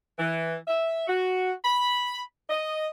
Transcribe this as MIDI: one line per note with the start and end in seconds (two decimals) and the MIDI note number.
0.19 0.56 52
0.68 1.07 76
1.07 1.52 66
1.65 2.21 83
2.50 2.87 75